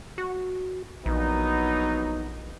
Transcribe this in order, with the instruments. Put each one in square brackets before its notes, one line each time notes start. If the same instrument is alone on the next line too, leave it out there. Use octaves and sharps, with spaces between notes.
[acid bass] F#4
[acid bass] A#1 [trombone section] F#3 B3 D#4